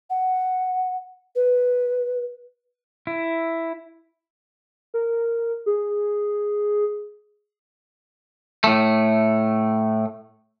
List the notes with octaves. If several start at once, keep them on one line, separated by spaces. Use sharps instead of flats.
F#5
B4
E4
A#4
G#4
A2 A3